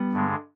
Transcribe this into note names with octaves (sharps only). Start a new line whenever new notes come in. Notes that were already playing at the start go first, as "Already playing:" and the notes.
Already playing: G3 B3
G2 D3 G#3